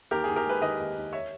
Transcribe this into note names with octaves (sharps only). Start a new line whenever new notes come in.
D#2 G4 A#4
D#2 G#4
G4 A#4
G#3 G#4 B4
D#3 B4 D#5
D#2
D#2
C#5 E5